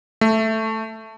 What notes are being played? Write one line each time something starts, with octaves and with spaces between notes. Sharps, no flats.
A3